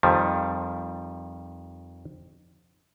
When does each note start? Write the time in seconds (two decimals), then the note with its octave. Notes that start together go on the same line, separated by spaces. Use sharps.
0.03 F2 D#3 F3 G3